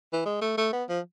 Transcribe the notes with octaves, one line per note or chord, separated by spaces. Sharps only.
E3
G#3
A3
A3
B3
F3